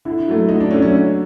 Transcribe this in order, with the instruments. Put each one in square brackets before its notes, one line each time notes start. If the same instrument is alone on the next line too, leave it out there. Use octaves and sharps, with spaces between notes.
[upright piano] D3 [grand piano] E4
[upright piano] F#3 A3
[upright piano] D3 [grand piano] D#4
[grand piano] D4
[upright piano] F#3 A3 [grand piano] C#4
[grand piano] C#4
[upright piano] D3